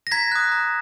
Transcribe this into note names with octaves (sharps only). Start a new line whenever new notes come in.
A#6
A#5 G#6 B6
D#6 F#6
A#5